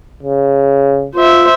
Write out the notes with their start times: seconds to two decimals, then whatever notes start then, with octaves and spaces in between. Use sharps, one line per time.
0.23 C#3
1.15 F4 C5 E5